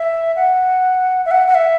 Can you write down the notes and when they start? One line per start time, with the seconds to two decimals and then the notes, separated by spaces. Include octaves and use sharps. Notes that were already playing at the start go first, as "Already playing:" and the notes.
Already playing: E5
0.36 F#5
1.26 E5
1.31 F#5
1.48 F#5
1.55 E5